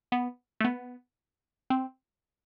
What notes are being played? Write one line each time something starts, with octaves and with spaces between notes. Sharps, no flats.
B3
A3
B3
C4